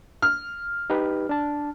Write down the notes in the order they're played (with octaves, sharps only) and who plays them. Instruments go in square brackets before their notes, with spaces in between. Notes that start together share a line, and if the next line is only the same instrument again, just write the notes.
[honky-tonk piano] F6
[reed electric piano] D#4 G4 B4
D4 A5